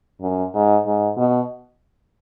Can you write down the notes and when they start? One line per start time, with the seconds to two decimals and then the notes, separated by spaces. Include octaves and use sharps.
0.21 F#2
0.54 G#2
0.86 G#2
1.17 B2